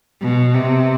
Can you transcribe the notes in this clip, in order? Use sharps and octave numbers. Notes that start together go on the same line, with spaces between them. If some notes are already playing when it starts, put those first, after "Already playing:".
B2
C3